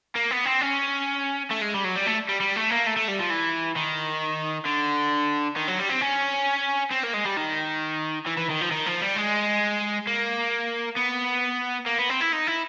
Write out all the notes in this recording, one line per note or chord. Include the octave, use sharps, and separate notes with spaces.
A#3
B3
C4
C#4
A3
G#3
G3
F#3
G3
A3
G3
G3
A3
A#3
A3
A3
G3
F3
E3
D#3
D3
D#3
F#3
G3
C4
C#4
C4
A#3
G#3
G3
D#3
E3
E3
D#3
F3
D#3
F3
G3
G#3
A#3
B3
A#3
B3
C4
E4
D#4
E4